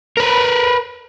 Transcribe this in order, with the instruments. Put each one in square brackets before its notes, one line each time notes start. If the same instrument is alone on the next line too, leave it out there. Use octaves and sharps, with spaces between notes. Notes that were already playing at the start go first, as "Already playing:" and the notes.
[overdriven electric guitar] A#4 B4